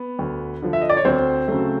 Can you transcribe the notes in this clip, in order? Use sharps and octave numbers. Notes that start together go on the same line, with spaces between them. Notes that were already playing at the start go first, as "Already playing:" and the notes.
Already playing: B3
D2
D3 F3
E5
D#5
D5
C#5
D2 C4 C5
C#3 F#3 A3